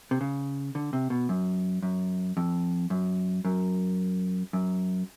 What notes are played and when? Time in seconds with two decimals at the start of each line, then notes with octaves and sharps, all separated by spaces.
0.11 C3
0.21 C#3
0.75 D3
0.93 C3
1.10 B2
1.29 F#2
1.83 F#2
2.37 F2
2.90 F#2
3.45 F#2
4.53 F#2